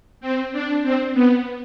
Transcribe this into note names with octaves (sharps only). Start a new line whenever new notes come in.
C4
D4
C4
B3